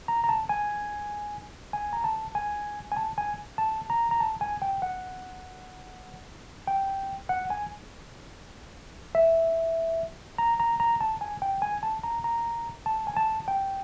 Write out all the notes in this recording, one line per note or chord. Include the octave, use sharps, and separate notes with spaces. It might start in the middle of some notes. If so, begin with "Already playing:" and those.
A#5
A#5
A5
G#5
G#5
A#5
A5
G#5
G#5
A5
G#5
A5
A#5
A#5
A5
G#5
G5
F#5
G5
F#5
G#5
E5
A#5
A#5
A#5
A5
G#5
G5
G#5
A5
A#5
A#5
A5
G#5
A5
G5